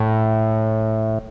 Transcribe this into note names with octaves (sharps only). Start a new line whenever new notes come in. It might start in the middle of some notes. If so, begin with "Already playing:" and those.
Already playing: A2